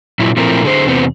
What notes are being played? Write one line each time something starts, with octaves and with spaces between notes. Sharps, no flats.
A#2 F#3 E4
A#2 F3 A3 C4 E4 A#4
D3 G#4 C5
E2 C3 B3 C4